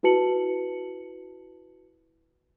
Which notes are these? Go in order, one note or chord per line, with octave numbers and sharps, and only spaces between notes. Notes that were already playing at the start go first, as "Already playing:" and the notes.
E4 F#4 B4 A5 C#7 F#7